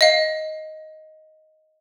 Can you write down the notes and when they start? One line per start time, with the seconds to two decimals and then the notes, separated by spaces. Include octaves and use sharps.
0.01 D#5 F5